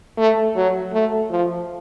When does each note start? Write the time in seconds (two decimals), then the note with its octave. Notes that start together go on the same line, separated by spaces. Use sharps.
0.18 A3
0.56 F#3
0.93 A3
1.31 F3